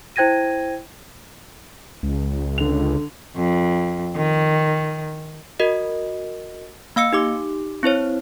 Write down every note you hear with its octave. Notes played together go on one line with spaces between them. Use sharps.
E4 C5 G5 G#6 A#6 D#7
C#2
D3 F7
F2
D#3
F#4 A#4 D#5
A#3 F5 E6 C#7
D#4 G4 D6
C4 E4 C5 C#5